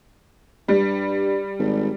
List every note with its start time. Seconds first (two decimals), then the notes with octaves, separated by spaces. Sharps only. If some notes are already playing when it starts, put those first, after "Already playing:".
0.68 G2 G3
1.59 G#1